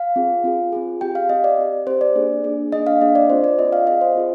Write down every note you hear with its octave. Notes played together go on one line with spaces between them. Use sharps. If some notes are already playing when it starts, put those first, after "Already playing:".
Already playing: F5
C4 F4 G#4
C4 F4 G#4
C4 F4 G#4
C4 G4 G5
F5
C4 G4 D#5
D5
C4 G4
C4 G4 C5
D5
A#3 D4 G#4
A#3 D4 G#4
A#3 D4 G#4 D#5
F5
A#3 D4 G#4 D#5
D5
C4 F4 G#4 C5
D5
C4 F4 G#4 D#5
F5
C4 F4 G#4 D#5
C5
C4 F4 G#4